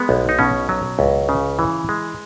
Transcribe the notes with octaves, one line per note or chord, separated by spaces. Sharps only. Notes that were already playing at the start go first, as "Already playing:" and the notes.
Already playing: G#3 B3
B1
D#4
B2 C#4
F#3
C#2
C#3
E3
G#3